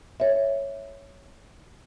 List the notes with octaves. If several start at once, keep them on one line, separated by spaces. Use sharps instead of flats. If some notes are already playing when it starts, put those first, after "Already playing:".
C#5 E5